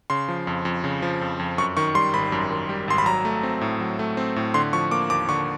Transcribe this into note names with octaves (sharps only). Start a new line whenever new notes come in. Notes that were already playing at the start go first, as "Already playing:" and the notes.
C#3 C6
F3
F2
F2
C#3
F3
F2
F2
F#2 C#6
D#3 C#6
G3 C6
G#1 B5
F#2
D#3
G3
G#1 C6
B5
F#3 A#5
A3
C4
A2
F#3
A3
C4
A2
D3 C6
F3 C#6
A#3 D6
D#2 D6
D3 C#6